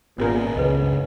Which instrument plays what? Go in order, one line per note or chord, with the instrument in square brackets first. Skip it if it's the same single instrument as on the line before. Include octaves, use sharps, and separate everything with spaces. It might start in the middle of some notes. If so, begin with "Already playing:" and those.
[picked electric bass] G#1 C#4 [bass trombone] A#2 [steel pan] B3 G#4 A#4
[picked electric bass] C#2 F#2 [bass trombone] C#3 [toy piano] B4 D#5